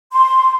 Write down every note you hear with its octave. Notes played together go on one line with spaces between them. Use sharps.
C6